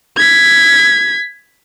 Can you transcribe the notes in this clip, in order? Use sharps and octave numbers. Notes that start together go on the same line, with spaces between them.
G#6 B6